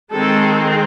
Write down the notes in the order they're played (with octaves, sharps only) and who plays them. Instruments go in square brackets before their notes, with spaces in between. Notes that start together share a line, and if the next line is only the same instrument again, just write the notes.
[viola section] D#3 G#3 C4 A4